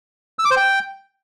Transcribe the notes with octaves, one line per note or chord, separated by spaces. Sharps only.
E6
D6
C5
G5